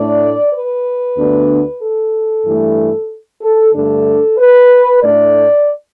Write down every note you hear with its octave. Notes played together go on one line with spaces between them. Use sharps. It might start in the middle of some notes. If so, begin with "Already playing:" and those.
Already playing: A2 A3 D4 D5
B4
D2 D3 B3 D4
A4
G2 E3 A3
A4
G2 D3 A3 D4 A4
B4
A2 A3 D4 D5